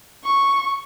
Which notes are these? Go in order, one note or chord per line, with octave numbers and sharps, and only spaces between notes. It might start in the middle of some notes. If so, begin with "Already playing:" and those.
C#6